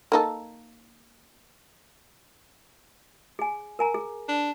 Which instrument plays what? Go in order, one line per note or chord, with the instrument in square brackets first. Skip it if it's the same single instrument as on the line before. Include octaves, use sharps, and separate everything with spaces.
[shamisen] A#3 D#4 A4
[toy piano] G#4 G#5
A#4 G#5 A#5
G#4
[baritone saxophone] D4